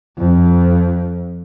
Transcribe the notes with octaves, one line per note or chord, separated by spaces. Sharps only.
F2